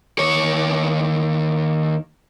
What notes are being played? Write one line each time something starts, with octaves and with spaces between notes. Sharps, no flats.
D#2 C#5